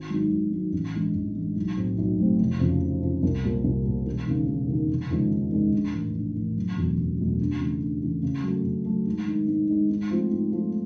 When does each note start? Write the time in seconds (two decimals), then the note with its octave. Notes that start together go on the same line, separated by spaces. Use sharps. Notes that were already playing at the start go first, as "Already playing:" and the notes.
Already playing: G#1
0.10 G#2 D#3 F#3
0.31 G#1
0.52 G#2 D#3 F#3
0.73 A1
0.94 G2 E3 G#3
1.15 A1
1.36 G2 E3 G#3
1.56 B1
1.77 A2 F#3 A3 C4
1.98 B1
2.19 A2 F#3 A3 C4
2.39 F1
2.60 F2 C#3 F3
2.81 F1
3.02 F2 C#3 F3
3.23 C2
3.44 A#2 G3
3.64 C2
3.85 A#2 G3
4.06 E1
4.27 D#2 C#3
4.48 E1
4.69 D#2 C#3
4.90 F1
5.11 D#2 C#3 F3 G#3
5.31 F1
5.52 D#2 C#3 F3 G#3
5.73 A#1
5.94 A2 E3
6.14 A#1
6.35 A2 E3
6.56 F#1
6.77 E2 B2 F#3 A3
6.98 F#1
7.19 E2 B2 F#3 A3
7.39 D2
7.60 C#3 E3 A3
7.81 D2
8.02 C#3 E3 A3
8.23 C#3
8.43 F#3 A3
8.64 C#3
8.85 F#3 A3
9.06 G#2
9.27 D#3 G#3
9.48 G#2
9.69 D#3 G#3
9.90 G#2
10.10 F3 A3 C4 F4
10.31 G#2
10.52 F3 A3 C4 F4